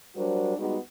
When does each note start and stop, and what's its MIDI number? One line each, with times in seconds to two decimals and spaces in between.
0.16 0.54 54
0.16 0.54 55
0.16 0.54 62
0.16 0.54 66
0.16 0.54 70
0.16 0.54 72
0.57 0.77 55
0.57 0.77 56
0.57 0.77 59
0.57 0.77 63
0.57 0.77 66